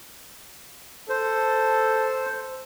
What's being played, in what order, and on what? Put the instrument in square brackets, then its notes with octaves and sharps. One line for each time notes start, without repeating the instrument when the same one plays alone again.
[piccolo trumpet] A4 [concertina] C5